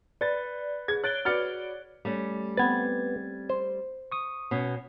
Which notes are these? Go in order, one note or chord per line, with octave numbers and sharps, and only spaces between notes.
B4 D5 A6
G#4 G#6
C#5 F#6 A6 D7 G7
F#4 B4 D5 F6 A6 C#7
G3 A3 C#4
B3 C4 B4 G#6 A6
C5
C#6 D#6
B2 C#4